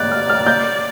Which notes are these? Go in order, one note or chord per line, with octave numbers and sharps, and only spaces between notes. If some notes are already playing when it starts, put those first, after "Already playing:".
Already playing: D5 F#6 G6
F6
F6
G6